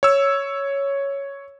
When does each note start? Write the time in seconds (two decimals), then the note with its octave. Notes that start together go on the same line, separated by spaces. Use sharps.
0.03 C#5 E6